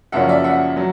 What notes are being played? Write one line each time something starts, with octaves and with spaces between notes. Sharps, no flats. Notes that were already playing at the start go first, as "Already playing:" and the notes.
F#2 C#3 F3 A#3 C#4 E5 F#5
D5 E5
E5 F#5
F#3